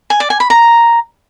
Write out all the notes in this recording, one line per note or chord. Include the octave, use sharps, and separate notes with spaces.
G#5
D5
G#5
B5
A#5